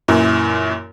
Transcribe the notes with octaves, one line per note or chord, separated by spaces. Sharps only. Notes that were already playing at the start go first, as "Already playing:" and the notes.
F#2 A#2 E3